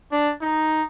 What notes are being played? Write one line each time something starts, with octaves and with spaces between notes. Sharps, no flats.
D4
D#4